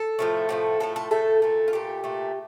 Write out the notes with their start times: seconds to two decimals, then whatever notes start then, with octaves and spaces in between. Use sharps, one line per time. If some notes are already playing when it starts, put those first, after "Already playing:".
Already playing: A4
0.19 A2 F3 A3
0.49 A2 F3 A3
0.80 A2 F3 A3 A4
0.96 A4
1.11 A2 F3 A3 A4
1.42 A#2 A3
1.68 F4
1.73 A#2 A3 G4
2.04 A#2 A3